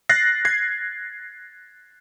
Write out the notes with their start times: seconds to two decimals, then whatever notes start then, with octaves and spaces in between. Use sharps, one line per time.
0.09 F#6 A6 A#6 C7
0.45 G#6 C7